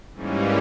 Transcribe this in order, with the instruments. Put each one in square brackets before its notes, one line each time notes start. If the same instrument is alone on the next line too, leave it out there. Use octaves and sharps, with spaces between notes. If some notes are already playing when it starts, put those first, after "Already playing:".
[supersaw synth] G#2 E3 G3 A#3 C#4